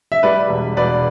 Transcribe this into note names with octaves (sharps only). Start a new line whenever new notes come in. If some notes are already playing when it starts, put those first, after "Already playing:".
E5
G3 B4 D5
E1
E1 B4 D5